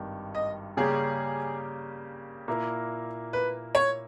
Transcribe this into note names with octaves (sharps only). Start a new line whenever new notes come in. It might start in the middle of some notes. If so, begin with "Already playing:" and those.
Already playing: G#1 G2 D#3
D#5
C#3 G3 A#3 C#4 G4 G#4
A#2 A#3 E4 A#4
B4
C#5